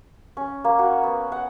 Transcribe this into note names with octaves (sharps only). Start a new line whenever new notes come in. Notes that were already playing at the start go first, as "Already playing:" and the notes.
C#4
A#3
F#4
B3
F#5